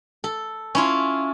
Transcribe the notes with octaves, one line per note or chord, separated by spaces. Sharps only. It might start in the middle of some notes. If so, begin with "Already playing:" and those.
A4
C#4 E4 F4